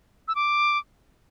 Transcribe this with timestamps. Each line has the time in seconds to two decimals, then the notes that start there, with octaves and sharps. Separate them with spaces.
0.28 E6
0.35 D6